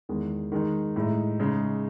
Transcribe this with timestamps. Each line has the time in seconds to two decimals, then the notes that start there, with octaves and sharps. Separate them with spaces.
0.09 E2 D#3 G#3
0.52 D#3 G#3 D#4
0.96 A2 G#3 D#4
1.40 C#3 G#3 D#4